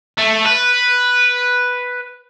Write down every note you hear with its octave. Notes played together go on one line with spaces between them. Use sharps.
A3
B4